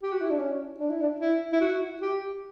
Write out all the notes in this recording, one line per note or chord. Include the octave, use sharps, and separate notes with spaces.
G4
F#4
E4
D4
C#4
D4
E4
D4
E4
E4
F#4
G4